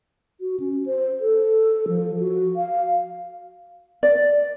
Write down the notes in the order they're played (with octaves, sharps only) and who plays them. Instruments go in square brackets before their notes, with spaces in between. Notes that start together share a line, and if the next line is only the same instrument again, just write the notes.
[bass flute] F#4
C#4
C5
A4
F3
F#4
F5
[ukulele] D5